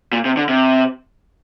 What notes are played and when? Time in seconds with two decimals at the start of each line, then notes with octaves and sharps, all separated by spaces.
0.13 A#2
0.25 C3
0.37 D3
0.49 C3